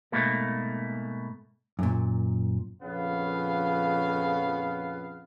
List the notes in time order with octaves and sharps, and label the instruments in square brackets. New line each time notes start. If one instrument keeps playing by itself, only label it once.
[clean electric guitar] G#2 B2 A3 A#3
[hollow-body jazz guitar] F#2 A#2
[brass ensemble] A#1 F2 C#3 B3 F5